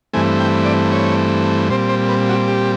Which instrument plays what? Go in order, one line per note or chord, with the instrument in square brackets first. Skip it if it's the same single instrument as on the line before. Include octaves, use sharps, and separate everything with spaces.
[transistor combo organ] G2 E3 A3 C4 G#5
G5
D5
C#5
A#2 G3 C4 C5
C5
B4
F#4
G4